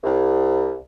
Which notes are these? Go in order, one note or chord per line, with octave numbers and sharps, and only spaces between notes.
C2